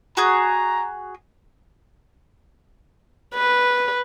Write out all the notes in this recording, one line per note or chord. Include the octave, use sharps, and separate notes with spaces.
F#4 G#4 A#5
B4